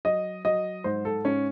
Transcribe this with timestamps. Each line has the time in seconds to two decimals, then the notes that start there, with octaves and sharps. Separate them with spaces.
0.05 F#3 D#5
0.45 F#3 D#5
0.84 G#2 C5
1.05 A4
1.25 G#2 C#4